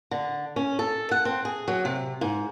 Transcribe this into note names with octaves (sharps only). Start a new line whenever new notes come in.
D3
C#4
A4
F#5
C4
G#4
F#3
C3
G#2